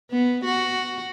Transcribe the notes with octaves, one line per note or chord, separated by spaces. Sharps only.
B3
F#4